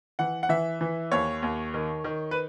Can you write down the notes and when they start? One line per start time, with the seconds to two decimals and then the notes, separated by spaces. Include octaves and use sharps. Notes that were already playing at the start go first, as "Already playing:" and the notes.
0.19 E3 F#5
0.43 F#5
0.49 E3 E5
0.81 E3
1.12 D#2 C#5
1.42 D#2
1.74 D#3
2.04 D#3
2.31 B4